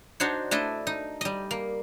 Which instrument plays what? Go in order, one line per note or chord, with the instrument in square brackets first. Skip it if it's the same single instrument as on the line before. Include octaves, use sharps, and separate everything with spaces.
[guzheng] D4 D#4 F#4 C5 C#5
A3 D4 E4 D#5
D#4
G3 D#5
A#3